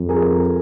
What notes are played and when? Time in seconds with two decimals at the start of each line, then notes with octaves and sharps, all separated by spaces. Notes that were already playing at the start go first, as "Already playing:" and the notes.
Already playing: F2
0.09 G#4 A#4